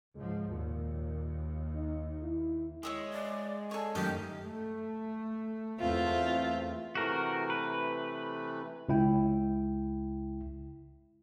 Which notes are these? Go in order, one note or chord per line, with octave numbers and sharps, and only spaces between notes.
C#2 G#2 F3 G#3
D#2 A#2
D#4
E4
G#3 C#5 E5 D#6
D5
A4 C#5 G#5
F#2 D#3 A3 G4 D#5 F5 A5
A3
E2 A3 C4 F4 E5
C3 E3 A3 F#4 A#4
B4
C#2 E4 G5